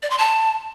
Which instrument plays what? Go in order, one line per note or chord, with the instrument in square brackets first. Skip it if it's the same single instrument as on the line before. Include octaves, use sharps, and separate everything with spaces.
[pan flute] D5
C6
A5